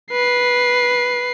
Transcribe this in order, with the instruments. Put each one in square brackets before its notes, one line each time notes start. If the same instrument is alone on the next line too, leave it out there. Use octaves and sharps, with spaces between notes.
[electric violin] B4 C7